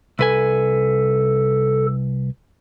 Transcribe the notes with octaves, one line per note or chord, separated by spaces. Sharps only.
C2 A4 B4 G#5